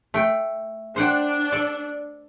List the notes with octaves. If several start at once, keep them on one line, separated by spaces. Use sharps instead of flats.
A3 G5
D4 C5 F#5 G5
A4 D5